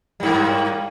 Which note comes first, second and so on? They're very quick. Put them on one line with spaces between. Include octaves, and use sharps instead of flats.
G3 G2 A#3